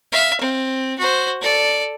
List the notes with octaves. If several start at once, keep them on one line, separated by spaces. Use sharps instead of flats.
E5 F5
C4
F#4 C5
A4 D5